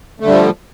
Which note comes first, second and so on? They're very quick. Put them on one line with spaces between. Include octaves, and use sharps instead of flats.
A3 D3 G3 F3